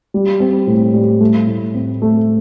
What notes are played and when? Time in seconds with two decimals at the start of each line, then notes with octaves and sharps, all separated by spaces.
0.14 G3
0.40 C4
0.67 A2
0.94 G3
1.20 A3
1.47 A2
1.74 C4
2.02 A3